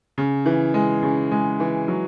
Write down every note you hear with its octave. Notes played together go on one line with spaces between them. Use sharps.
C#3
E3
G#3
C#3
G#3
E3
F#3